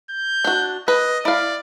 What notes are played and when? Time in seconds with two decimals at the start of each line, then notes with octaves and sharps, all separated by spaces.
0.10 G6
0.45 D4 F#4
0.88 B4 D#5
1.25 E4 D5 F5